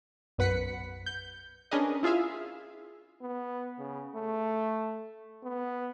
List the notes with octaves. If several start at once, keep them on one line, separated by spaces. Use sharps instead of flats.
B1 F#2 B4 F#5 B6 C#7
G6
C#4 D4 G#4 A#4 B4 D#5
E4 F4 G#4 E5 F5
B3
C#3
A3
B3